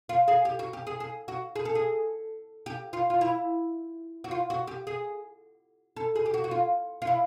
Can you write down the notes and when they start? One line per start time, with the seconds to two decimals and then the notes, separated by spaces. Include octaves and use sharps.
0.09 F4
0.28 G#4
0.45 G4
0.59 F#4
0.73 G4
0.87 G#4
1.00 G#4
1.28 F#4
1.56 G#4
1.65 A4
1.75 G#4
2.66 G4
2.93 F4
3.10 F4
3.21 E4
4.24 F#4
4.31 F4
4.50 F#4
4.67 G4
4.87 G#4
5.96 A4
6.15 G#4
6.26 G4
6.34 F#4
6.44 F#4
6.51 F4
7.02 F4
7.07 E4